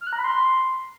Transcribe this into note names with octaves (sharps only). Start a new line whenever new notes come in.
F6
F#6
A#5
B5
C6